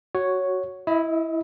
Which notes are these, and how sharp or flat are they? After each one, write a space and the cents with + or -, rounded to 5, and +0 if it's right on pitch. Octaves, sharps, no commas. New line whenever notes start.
F#4 +5 C#5 +0
E4 +0 D#5 +35